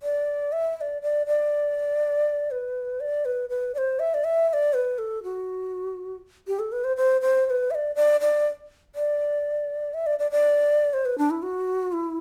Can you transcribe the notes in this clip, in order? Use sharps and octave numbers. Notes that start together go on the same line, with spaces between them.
D5
E5
E5
D5
D5
D5
B4
D5
B4
B4
D5
C5
E5
D5
E5
E5
D5
B4
A4
F#4
G4
A4
B4
C5
C5
C5
C5
B4
E5
D5
D5
D5
D5
E5
D5
D5
D5
C5
B4
D4
E4
F#4
E4